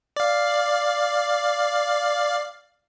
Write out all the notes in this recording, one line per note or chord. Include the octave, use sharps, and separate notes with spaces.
D5 F5